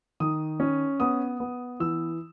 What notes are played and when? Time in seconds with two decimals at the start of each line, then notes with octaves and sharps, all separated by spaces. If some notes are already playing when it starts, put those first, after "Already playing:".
0.20 D#3 D#6
0.60 C#4
1.00 B3 D#6
1.40 B3
1.80 E3 E6